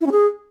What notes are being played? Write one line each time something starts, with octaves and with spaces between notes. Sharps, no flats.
E4
C#4
G#4